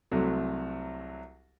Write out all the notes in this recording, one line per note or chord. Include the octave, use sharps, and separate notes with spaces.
C2 C3 F#3 A3